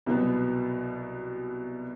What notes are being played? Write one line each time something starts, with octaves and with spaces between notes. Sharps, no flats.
C2 B2 F#3 B3